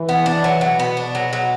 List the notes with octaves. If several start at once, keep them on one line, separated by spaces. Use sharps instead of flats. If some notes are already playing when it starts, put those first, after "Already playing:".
Already playing: E3
B3
D4
F#3
B2 F#3
B3
D4
F#3
F#3